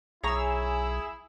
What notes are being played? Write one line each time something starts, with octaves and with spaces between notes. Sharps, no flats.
B1 E4 G#4 C#5 A#5 E6